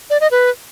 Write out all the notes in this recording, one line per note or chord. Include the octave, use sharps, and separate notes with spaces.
D5
D#5
B4